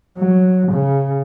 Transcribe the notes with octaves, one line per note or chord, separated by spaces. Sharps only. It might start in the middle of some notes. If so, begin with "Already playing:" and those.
F#3
C#3